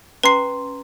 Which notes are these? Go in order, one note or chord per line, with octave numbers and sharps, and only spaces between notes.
C#4 B4 A#5 C6 C7